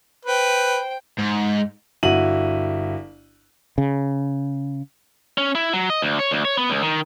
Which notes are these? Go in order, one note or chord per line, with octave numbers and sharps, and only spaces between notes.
B4 C5 G5
G#2
G1 E4 F#4 D#7 F#7
C#3
C#4
E4
F#3
D#5
D2
C#5
D2
C#5
B3
C#2
D#3